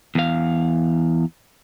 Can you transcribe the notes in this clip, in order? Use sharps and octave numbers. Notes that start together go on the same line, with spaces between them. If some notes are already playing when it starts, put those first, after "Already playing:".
E2 F5